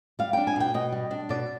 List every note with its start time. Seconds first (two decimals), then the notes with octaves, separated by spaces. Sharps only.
0.19 G3 F5
0.33 D4 G5
0.47 G#5
0.56 B2 G5
0.74 B2 D#5
0.92 G3
1.11 D4
1.29 B2 D5